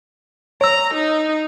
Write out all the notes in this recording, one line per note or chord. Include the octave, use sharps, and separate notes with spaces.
C#5 A#5 E6
D#4